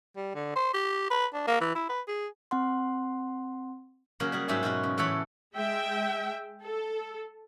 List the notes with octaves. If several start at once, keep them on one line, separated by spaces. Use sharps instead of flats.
G3
D3
C5
G4
B4
D4
A#3
E3
E4
B4
G#4
C4 F#5 C6
C#3 F#3 A#3 C#4
G3 F#4 G#4
G#2 F#3 F#4 G4 E5 G#5
B2 B3 C#4 F#4
C#3
A2 E3 A4 C#5 F#5 B5
G#3 E5 G5
A4